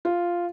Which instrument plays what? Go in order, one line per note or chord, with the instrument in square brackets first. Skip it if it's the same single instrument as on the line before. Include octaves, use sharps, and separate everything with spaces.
[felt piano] F4